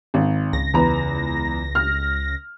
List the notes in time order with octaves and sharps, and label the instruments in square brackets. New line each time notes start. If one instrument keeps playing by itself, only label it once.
[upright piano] G#1
[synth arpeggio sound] C#2 A#6
[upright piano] E2 B4 A#5
F6